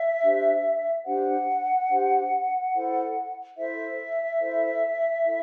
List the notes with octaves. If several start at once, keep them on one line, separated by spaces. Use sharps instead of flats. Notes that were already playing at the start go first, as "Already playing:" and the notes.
Already playing: E5
D4 G4 C5
D4 G4 C5 F#5
D4 G4 C5
E4 A4 C5
E4 A4 C5 E5
E4 A4 C5
E4 A4